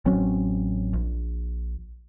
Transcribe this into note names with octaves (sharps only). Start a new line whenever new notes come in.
A1 F#3 C4 C#4
A#1